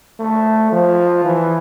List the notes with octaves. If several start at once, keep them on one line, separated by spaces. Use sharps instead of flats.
A3
F3
E3